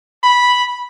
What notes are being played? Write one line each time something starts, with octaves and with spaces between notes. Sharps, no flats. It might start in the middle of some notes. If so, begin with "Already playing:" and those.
B5